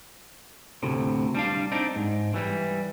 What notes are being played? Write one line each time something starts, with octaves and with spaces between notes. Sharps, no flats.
D2 A2 C3
G3 D4 F5
C4 D4 D#4
G#2
E3 G3